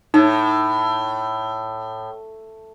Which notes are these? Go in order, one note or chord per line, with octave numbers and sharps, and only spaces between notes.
A2 D#4